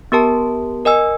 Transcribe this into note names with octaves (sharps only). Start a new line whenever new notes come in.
B3 G4 A#4 A5
A#4 D#5 G#5 E6